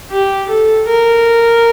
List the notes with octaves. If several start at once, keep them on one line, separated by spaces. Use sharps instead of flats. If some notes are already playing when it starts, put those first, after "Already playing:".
G4
A4
A#4